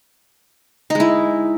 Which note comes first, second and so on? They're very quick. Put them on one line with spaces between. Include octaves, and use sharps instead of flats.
D#4 G#3 E4